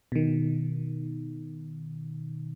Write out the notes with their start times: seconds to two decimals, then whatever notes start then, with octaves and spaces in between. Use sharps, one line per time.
0.12 B2 D#3